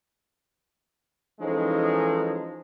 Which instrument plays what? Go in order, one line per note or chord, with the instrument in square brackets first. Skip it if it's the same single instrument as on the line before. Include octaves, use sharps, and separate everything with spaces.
[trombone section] E3 F3 G#3 C#4 D#4 A4